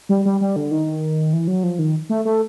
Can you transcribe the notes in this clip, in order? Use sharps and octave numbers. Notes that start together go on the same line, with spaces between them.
G3
G3
G3
D3
D#3
E3
F#3
F3
D#3
A3
A3